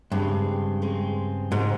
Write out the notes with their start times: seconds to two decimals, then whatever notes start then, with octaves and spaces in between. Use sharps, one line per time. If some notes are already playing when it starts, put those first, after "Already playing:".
0.12 G2 C#3 G#3 C4
0.82 C#3 G#3 C4
1.51 G#2 C#3 G#3 C4